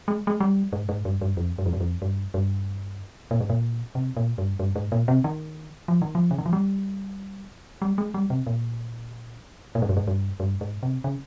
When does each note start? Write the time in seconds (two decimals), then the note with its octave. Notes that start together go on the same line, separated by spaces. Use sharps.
0.08 G#3
0.27 G#3
0.40 G3
0.73 G#2
0.89 G#2
1.05 G2
1.21 G2
1.37 F2
1.58 G2
1.66 F2
1.73 G2
1.80 F2
2.02 G2
2.34 G2
3.31 A#2
3.40 G#2
3.50 A#2
3.95 C3
4.17 A#2
4.38 G2
4.59 G2
4.76 G#2
4.92 A#2
5.08 C3
5.24 D#3
5.88 F3
6.02 D#3
6.15 F3
6.31 C#3
6.38 D#3
6.46 F3
6.53 G3
7.82 G3
7.98 G#3
8.14 G3
8.30 C3
8.47 A#2
9.75 A#2
9.82 G#2
9.89 G2
9.97 G#2
10.07 G2
10.40 G2
10.61 G#2
10.83 C3
11.04 C#3